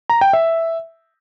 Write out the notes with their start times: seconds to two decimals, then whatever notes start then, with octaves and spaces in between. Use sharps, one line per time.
0.09 A#5
0.21 G5
0.33 E5